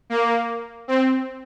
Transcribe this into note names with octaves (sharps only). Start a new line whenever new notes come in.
A#3
C4